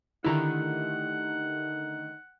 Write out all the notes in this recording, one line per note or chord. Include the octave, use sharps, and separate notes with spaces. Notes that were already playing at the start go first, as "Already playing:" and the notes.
D3 D#3 A3 D#4 E4 G4 F#5 A#5